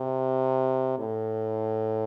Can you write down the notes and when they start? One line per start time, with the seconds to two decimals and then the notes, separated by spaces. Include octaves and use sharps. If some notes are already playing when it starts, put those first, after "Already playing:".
Already playing: C3
0.99 A2